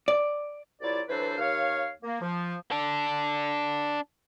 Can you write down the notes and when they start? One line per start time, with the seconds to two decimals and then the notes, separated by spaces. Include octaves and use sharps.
0.08 D5
0.81 C2 F#3 E4 F4 D5
1.08 E3 F#3 D4 A4 B4 C5
1.38 D#2 C#5 F5
2.02 A#3
2.20 F3
2.72 D4 A4